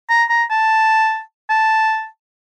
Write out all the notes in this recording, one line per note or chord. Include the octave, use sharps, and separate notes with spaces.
A#5
A#5
A5
A5